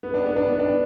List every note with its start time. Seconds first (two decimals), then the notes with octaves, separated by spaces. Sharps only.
0.03 B3
0.14 D4
0.26 B3
0.36 D4
0.48 B3
0.59 D4